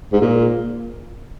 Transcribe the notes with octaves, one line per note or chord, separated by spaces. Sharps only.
G#2
A#2